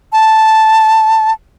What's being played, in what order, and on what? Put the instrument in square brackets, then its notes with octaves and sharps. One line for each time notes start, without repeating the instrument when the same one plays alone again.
[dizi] A5